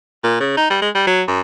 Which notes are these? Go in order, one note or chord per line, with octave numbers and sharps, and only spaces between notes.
A#2
C#3
D#4
G3
G#3
G3
F#3
F#2